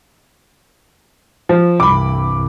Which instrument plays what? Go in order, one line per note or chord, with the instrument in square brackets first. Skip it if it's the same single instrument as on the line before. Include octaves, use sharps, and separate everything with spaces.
[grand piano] F3
[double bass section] C2 G2 E3 [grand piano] B5 D6